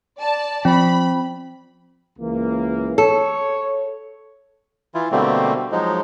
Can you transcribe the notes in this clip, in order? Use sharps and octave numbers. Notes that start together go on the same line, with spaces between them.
D5 A5
F3 C4 B5
C#2 E3 A#3
A4 C#5
E3 E4 F4
B2 D3 G3 A3 A#3 C4
F3 F#3 G#3 D#4